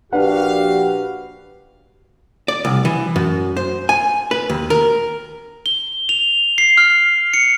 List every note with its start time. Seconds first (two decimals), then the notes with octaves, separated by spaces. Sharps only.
0.13 A#1 D4 F#4 G4 B4 F5 F#5
2.48 D5
2.65 C2
2.85 E3
3.16 F#2
3.57 C5
3.89 G#5
4.31 B4
4.50 D#2
4.70 A#4
5.66 G7
6.09 F7
6.58 C7
6.77 F6
7.34 C#7